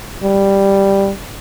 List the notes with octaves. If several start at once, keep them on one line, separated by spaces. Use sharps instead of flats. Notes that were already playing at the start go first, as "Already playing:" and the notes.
G3